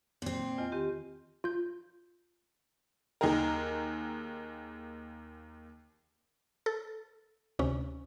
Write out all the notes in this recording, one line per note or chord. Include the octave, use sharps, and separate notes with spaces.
A#2 C4
E2 F4 D#5
D#3 C4 G4
F4 G6
D#2 D#4 G#4 A#4
A4
D2 C3 C#4